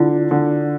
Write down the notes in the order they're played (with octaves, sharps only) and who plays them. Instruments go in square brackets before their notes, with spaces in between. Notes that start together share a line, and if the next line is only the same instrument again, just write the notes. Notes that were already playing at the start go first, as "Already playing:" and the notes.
Already playing: [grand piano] D3 [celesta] E4 F4
[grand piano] D3